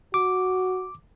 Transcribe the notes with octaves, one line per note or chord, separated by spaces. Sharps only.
F#4 D6